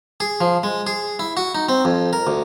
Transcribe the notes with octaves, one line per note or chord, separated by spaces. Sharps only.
G#4
F3
G#3
G#4
E4
F#4
D#4
C4
F2
A#4
D2